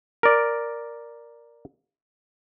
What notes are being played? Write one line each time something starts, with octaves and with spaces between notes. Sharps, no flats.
A#4 D5